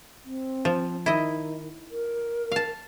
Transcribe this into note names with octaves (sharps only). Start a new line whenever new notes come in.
C4
F3
D#3 E4 D#5
A#4
F5 A5